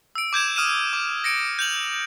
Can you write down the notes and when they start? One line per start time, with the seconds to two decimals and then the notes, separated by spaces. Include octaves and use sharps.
0.15 E6 D7
0.33 D6 G6 G#6 E7
0.56 D#6 F6 D#7 E7
0.93 D6
1.24 A#6 C#7 D7
1.59 G6 F7 F#7